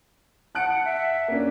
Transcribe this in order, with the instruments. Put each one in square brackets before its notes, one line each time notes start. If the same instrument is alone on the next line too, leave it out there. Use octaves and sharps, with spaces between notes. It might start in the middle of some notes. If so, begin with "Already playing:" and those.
[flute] F#5 [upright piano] A5 F#6 D7
[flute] E5
[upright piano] A#3 C#4 D4